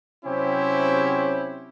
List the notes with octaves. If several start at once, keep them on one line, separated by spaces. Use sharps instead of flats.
C3 F#3 C4 C#4 E4 G4